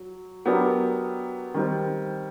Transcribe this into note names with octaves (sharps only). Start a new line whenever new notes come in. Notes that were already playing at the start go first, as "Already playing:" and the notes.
Already playing: F#3
F#3 B3 D4 G4 A#4
D#3 G3 C4